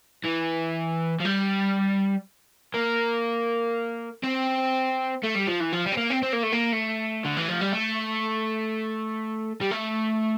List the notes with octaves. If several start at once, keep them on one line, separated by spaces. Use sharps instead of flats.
E3
F3
G3
A#3
C4
A3
G3
F3
E3
F3
G3
C4
A#3
C4
C4
A#3
A3
A#3
A3
D3
E3
F3
G3
A3
G3
A3